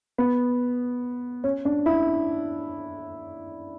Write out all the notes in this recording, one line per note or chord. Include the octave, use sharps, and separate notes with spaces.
B3
C#4
D4
E4